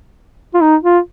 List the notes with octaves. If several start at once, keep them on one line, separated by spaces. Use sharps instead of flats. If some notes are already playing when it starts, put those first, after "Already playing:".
F4
D#4
F4